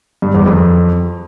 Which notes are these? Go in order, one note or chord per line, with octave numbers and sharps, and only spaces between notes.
G2
E2
F2